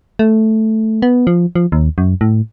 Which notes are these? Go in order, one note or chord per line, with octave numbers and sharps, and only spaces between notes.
A3
B3
F3
F3
D#2
F#2
A2